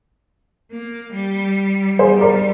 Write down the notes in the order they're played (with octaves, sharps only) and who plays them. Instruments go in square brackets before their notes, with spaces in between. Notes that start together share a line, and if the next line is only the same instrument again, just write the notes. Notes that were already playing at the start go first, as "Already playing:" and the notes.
[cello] A#3
G3
[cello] G3 [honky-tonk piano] G#4 C5
[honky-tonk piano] A#4 D5